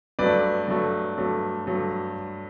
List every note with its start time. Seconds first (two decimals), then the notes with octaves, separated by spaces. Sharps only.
0.19 G2 F#3 A3 B4 D5
0.68 G2 F#3 A3
1.18 G2 F#3 A3
1.67 G2 F#3 A3